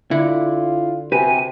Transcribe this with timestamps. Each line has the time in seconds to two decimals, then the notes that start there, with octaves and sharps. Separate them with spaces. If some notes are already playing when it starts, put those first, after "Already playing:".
0.11 D3 E4 F4
1.12 C3 F#4 G4 B4 G#5